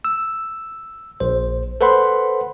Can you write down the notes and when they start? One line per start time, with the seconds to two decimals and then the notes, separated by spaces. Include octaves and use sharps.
0.05 E6
1.20 A#1 C5
1.81 A4 B4 C5 F#5 B5 C6